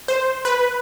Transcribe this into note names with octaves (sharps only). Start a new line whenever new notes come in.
C5
B4